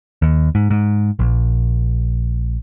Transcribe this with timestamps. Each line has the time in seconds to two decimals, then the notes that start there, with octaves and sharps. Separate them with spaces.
0.22 D#2
0.55 G#2
0.70 G#2
1.19 A#1